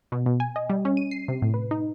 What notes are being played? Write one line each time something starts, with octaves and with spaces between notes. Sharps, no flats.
B2
B2
G#5
D#5
G3
C#4
D#7
C7
C3
A2
B4
D#4